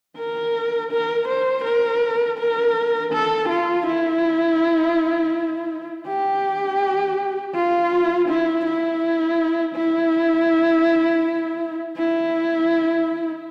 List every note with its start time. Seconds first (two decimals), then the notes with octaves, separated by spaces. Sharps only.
0.17 A#4
0.92 A#4
1.28 C5
1.64 A#4
2.39 A#4
3.13 A4
3.49 F4
3.86 E4
6.07 G4
7.55 F4
8.29 E4
8.65 E4
9.75 E4
11.97 E4